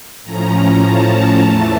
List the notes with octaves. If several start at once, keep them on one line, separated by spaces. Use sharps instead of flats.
A2 F3 C#4 A#5
A5
E2 E3 A3